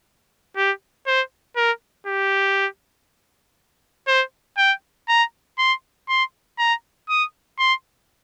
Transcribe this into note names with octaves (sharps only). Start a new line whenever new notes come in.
G4
C5
A#4
G4
C5
G5
A#5
C6
C6
A#5
D#6
C6